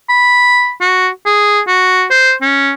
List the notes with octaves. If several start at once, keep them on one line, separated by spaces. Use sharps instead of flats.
B5
F#4
G#4
F#4
C5
C#4